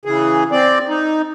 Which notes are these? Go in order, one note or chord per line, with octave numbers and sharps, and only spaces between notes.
C#3 E3 G#4
C4 D5
D#4